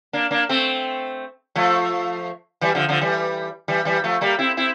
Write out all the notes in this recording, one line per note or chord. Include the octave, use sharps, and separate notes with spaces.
A#3 D4
A#3 D4
A3 C4
F3 A3
E3 G3
D3 F3
D3 F3
E3 G3
E3 G3
E3 G3
F3 A3
G3 A#3
C4 E4
C4 E4